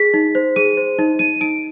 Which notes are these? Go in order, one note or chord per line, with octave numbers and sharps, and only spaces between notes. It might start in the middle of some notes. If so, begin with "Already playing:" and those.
Already playing: G#4 B6
D#4
C5
G#4 D#7
C5
D#4
D#4 D#7
D#4 D7